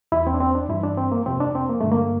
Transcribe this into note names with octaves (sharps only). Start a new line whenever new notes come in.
E2 E3 E4
C4
D4
C4
D4
G2 E3 E4
D4
C4
A#3
F2 C3 F3 C4
D4
C4
A#3
G2 D3 F3 A3
A#3